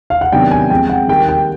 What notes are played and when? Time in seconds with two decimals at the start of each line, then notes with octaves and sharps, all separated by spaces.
0.10 F5
0.21 F#5
0.32 C3 D#3 F#3 B3 D4 G5
0.51 G#5
0.70 F3 G#3 C4 G5
0.89 F#5
1.08 D#3 G3 A#3 G5
1.28 G5